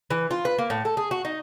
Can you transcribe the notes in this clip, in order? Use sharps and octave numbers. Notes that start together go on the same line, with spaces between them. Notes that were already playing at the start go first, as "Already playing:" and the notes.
E3
F4
B4
A#3
A2
A4
G#4
F#4
D#4